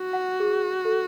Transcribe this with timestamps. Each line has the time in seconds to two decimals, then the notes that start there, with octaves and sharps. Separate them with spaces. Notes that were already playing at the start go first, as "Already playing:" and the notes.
Already playing: F#4
0.13 F#5
0.40 G#4
0.85 A4